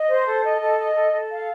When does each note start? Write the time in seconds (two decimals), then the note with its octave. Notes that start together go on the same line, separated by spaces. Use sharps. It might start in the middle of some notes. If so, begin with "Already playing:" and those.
Already playing: D#5
0.09 C5
0.26 A4
0.44 D#5
0.61 A4
0.78 D#5
0.95 A4
1.13 A4
1.31 F5